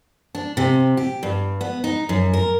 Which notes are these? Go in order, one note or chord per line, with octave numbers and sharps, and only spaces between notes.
D4
C3
G4
G2
B3
D#4
F#2
A#4